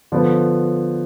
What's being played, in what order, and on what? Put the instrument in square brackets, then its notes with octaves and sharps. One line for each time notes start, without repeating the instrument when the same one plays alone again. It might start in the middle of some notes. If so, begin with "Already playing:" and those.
[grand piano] D3 F3 B3